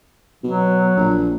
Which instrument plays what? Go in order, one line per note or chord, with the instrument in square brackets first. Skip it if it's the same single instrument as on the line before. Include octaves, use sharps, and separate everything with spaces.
[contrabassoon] B2 [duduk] F#3
[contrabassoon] A#1